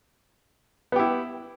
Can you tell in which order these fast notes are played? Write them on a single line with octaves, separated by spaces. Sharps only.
B3 G4 E4